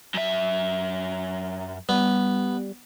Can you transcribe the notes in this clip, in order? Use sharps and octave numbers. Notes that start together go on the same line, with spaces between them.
F#2 E5
G3 B3